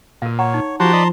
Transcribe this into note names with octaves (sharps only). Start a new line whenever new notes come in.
A#2 A#4 F5
C#5 F#5 A#5
D#4
F3 F#4 G4 C5 A5 A#5 C6
D5 D#5 B5